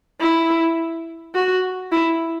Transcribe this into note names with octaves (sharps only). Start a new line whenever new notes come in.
E4
F#4
E4